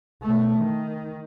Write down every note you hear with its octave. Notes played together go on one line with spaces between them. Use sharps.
B2 A3
D#3